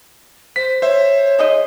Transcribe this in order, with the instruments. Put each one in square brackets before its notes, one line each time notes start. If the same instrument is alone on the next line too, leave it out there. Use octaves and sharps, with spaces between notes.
[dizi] C5 [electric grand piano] B6
[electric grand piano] C5 E5 [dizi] C#5
[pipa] G#3 D#4 D#5